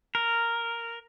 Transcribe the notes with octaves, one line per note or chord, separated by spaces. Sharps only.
A#4